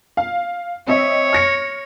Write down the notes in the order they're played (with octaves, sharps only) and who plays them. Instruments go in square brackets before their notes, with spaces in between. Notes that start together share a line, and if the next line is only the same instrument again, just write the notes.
[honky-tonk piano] F5
[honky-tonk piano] C4 D#5 E5 [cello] C#5
[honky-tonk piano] F6 A#6 C#7